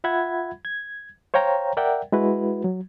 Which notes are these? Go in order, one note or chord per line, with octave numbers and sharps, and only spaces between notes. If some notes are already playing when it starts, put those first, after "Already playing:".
F4 E5 F#5 B5 G#6
G#6
C5 C#5 F5 G5 A#5
A#4 D5 E5 F#5 G5
G#3 E4 F#4 B4
F#3